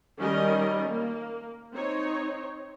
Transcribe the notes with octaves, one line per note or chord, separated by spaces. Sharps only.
D#3 G3 C#4 A#4 D#5
A#3
C4 D#4 C#5